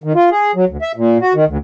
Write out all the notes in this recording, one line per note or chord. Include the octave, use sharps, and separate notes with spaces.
D#3
F4
G#4
F#3
D2
E5
A#2
F#4
D#3
D2